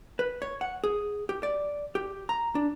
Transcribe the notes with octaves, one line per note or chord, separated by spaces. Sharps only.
B4
C#5
F#5
G#4
G4
D5
G4
A#5
D4